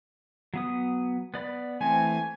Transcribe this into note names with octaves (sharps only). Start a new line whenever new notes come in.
F#3 B3 D#6
B3 D5 B5
E3 A3 C4 G#5